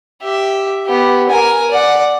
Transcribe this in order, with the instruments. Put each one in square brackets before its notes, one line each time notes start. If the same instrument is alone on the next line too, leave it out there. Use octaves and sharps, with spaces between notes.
[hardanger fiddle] G4 E5
B3 G4
A#4 G#5
D5 F#5